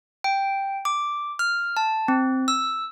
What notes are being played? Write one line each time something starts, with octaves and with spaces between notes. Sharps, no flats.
G5
D6
F6
A5
C4
E6